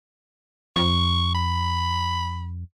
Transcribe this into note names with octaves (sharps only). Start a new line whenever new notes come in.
F2 C#6
B5